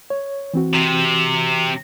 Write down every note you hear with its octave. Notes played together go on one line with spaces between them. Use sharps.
C#5
E3 C4 F#4
C3